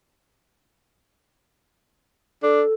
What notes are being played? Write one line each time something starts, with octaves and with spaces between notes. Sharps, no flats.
D4 A4